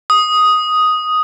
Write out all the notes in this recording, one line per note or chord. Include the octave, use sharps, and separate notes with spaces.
D#6